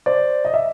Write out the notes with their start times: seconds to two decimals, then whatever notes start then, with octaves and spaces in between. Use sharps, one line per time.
0.06 C5 D5
0.45 D#5
0.54 E5